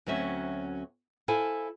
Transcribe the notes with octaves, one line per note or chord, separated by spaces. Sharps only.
D2 F#3 C4 C#4 E5
E4 A4 C5 F5 G#5